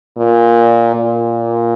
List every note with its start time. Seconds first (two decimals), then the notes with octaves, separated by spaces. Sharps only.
0.18 A#2
0.95 A#2